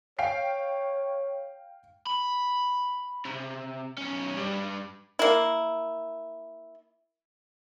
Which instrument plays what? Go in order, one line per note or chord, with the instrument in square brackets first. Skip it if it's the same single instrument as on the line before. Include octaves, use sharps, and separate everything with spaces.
[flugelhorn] C#5 [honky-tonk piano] F5 G5 C7
[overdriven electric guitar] B5
C3
B1 C#4
G2 G3
[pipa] A#3 E4